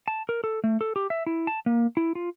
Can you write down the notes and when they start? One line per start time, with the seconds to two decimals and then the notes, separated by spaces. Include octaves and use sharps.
0.08 A5
0.29 A#4
0.44 A4
0.64 A3
0.81 A4
0.96 G4
1.10 E5
1.26 E4
1.47 A5
1.66 A#3
1.97 E4
2.15 F4